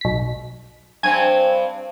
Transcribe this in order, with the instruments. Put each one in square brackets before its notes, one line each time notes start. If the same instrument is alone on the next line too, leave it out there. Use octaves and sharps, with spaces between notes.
[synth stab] B1 B6
[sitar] G2 C4 [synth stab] G#5 G#6 D#7